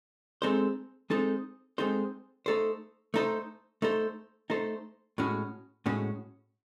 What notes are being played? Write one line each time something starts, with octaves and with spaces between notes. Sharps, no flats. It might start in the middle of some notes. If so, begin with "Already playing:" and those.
G#3 C4 D#4 A4 C5
G#3 C4 D#4 A4 C5
G#3 C4 D#4 A4 C5
A3 D#4 A4 C5
A3 D#4 A4 C5
A3 D#4 A4 C5
A3 D#4 A4 C5
A2 G#3 C#4 F#4
A2 G#3 C#4 F#4